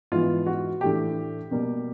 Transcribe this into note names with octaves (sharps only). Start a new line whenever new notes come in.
G#2 E3 G#3 B3 F4
F#4
A2 E3 A3 D4 G4
B2 G3 A#3